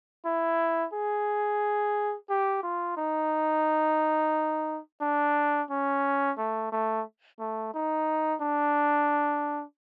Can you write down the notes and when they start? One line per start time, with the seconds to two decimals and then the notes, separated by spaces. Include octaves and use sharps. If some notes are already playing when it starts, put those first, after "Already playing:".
0.25 E4
0.93 G#4
2.30 G4
2.63 F4
2.97 D#4
5.01 D4
5.70 C#4
6.38 A3
6.72 A3
7.39 A3
7.74 D#4
8.41 D4